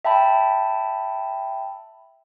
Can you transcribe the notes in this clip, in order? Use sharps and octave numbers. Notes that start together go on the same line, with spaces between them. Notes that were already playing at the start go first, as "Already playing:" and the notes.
E5 G5 A5 B5